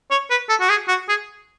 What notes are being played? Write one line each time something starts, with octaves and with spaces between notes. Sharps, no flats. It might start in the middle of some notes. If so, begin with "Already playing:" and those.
C#5
B4
A4
F#4
G#4
F#4
G#4